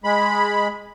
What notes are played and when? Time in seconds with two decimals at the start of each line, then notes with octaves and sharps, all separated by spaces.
0.04 G#3 B5